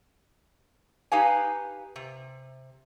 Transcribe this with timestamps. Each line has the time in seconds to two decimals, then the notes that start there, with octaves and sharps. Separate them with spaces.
1.12 D#4 G4 B4 F5 G#5
1.96 C3